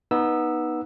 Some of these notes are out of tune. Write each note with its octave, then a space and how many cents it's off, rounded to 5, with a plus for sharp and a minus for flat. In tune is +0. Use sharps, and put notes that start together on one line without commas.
B3 -15 D#4 +0 E6 +0